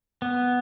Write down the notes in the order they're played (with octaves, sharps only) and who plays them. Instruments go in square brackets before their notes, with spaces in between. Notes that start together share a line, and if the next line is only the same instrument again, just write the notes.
[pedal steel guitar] B3